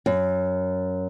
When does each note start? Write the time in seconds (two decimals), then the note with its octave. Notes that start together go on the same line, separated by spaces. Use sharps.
0.06 F#2